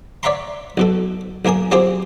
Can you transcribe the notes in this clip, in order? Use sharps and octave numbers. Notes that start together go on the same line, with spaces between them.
C#5 D5 E5 F#5 A#5 C6
B1 B2 A4
B1 A#3 A#4 G#5 D#6
F#3 C4 F4 G4 G#4 C5